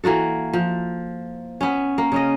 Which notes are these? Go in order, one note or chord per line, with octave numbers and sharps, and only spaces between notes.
E3 A#3 F#4 A4
F3
B3 C#4
A#3
C#3 C#4 D#5